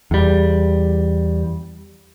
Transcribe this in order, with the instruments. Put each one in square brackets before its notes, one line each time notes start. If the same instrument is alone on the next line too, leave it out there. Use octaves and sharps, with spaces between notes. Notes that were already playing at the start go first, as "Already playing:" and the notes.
[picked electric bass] E2 G3